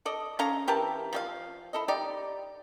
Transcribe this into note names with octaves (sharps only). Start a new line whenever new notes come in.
A4 D5 D#5
C#4 A4 F5 A#5
E3 G4 A#4 A5
F3 G4 F5
E4 A4 D#5
D#4 G4 D5